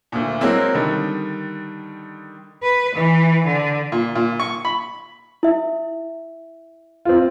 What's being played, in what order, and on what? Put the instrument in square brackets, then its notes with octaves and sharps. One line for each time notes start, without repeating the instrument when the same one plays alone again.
[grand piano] D2 A#2
F#3 G#3 A#3 C4 E4
D3 D#3 G3
[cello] B4
E3
D3
[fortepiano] A#2
A#2
C#6
B5
[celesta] E4 E5
[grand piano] C4 F4